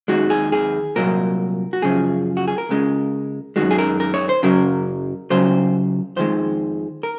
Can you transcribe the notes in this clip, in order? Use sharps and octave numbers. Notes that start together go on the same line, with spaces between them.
D#2 D#3 G#3 F#4
G#4
G#4
C2 A#2 F#3 A#4
F#4
F#2 C#3 F3 G#4
F#4
G#4
A#4
C#2 C#3 G#3
F#2 D#3 G#3 F#4
G#4
A#4
A#4
C#5
C5
F#2 C#3 F#3 A#4
C#2 C#3 F#3 C5
F2 D#3 G#3 C5
A#4